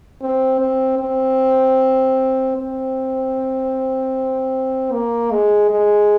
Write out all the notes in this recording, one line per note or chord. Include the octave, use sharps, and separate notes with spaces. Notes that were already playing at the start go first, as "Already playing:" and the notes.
C4
C4
C4
C4
A#3
G#3
G#3